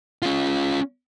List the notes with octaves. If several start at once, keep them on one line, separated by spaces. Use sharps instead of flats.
C#4 F4